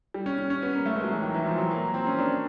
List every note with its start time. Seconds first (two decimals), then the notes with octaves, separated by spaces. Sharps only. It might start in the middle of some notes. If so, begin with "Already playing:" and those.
0.14 G3
0.26 C#4
0.38 C#4
0.50 C#4
0.62 B3
0.75 A#3
0.86 A3
0.95 G#3
1.04 F#3
1.13 E3
1.22 D#3
1.34 E3
1.46 F3
1.58 F#3
1.70 A#3
1.94 C4
2.07 C#4
2.19 D4